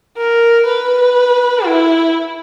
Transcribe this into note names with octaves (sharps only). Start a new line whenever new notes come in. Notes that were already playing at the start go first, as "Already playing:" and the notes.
A#4
B4
E4